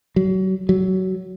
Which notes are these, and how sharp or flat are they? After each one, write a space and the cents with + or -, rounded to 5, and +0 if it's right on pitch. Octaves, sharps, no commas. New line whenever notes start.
F#3 +30
F#3 +20